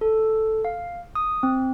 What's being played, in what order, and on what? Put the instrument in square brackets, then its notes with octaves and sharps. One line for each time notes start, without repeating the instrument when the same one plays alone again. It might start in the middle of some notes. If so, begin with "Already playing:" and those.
[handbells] A4
F5
D#6
C4